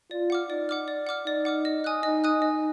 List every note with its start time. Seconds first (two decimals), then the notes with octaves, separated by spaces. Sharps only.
0.11 F4 D5
0.30 F#5 D6 F6
0.49 D#4 D5
0.69 F#5 D6 F6
0.88 D5
1.07 F#5 D6 F6
1.26 D#4 D5
1.45 F#5 D6 F6
1.65 D#5
1.84 G#5 D#6 F#6
2.03 D#4 D#5
2.24 G#5 D#6 F#6
2.42 D#4 D#5